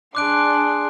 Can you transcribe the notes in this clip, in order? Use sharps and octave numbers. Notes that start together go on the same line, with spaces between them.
D4 G#4 C6 D6 F#6 D7